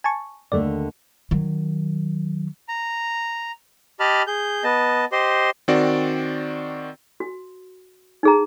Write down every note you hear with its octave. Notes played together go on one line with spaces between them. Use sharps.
G#5 A5 C#6
D#2 D3 A3 D5
D#3 F#3
A#5
G4 D#5 A5 B5 F6
G#4 G6
B3 D#5 A5
G4 C5 D#5 C6
D#3 C4 F#4 D5
F#4
D#4 G#4 A#5